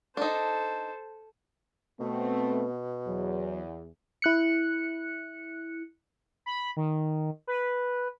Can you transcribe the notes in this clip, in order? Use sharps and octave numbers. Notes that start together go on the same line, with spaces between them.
D4 D#4 A4 C5
B2 A3 B3 C4
E2 F#3
E4 F#6 C#7
B5
D#3
B4